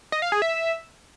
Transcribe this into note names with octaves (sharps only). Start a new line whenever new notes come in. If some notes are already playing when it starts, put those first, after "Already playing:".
D#5
F5
G#4
E5